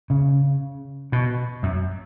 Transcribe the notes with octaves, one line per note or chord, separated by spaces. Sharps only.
C#3
B2
F#2